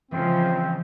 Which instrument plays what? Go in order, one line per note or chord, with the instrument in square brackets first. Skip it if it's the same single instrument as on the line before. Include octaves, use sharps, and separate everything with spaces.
[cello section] C#3 F3 [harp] E3 G#3 [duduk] C4